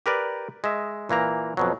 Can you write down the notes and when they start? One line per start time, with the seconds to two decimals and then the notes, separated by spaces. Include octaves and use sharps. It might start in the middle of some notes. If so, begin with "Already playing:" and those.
0.06 G4 A#4 B4 D5
0.64 G#3 D#5 E5
1.09 A#2 E3 A#3 A#5
1.57 F2 B2 F#3